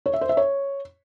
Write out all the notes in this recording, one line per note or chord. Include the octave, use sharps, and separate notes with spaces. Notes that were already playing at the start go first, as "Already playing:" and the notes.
C#5
E5
C5
E5
C#5